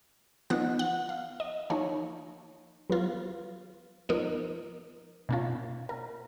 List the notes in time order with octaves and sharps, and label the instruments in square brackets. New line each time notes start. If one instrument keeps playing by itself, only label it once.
[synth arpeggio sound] F3 B3 D#4 F#5
F#5
F5
D#5
F3 A#3 D#4 C#5
F#3 B3 F4
F3 B3 D#4 A#4
B2 A#3 C#4 F4
A#4